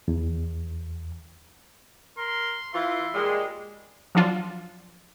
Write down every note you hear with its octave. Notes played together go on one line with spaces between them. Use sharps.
E2
A#4 C6
E3 F4 E5 C6
A#2 G3 G#3
F3 F#3 D4 F4